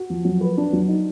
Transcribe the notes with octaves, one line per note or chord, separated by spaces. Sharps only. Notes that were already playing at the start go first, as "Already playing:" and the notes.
Already playing: F#4
F3
F#3
B4
D4
F#3
D#4